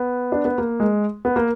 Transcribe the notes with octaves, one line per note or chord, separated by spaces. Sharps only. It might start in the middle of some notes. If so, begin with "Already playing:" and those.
Already playing: B3
D4
B3
A#3
G#3
B3
A#3